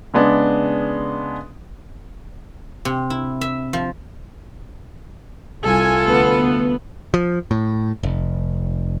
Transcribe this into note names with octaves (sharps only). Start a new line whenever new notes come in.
C#3 G#3 B3 D4
C3
E4
E5
F3
C2 F4 A4 G#5
D2 B3
F3
A2
F1